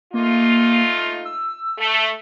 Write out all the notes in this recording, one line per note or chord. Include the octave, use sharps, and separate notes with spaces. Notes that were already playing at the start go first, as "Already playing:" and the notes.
A3 A#3 D#4 F4
E6
A3